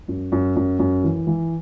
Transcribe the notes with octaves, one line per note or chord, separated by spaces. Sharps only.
F#2
F#2
F#2
F#2
E3
E3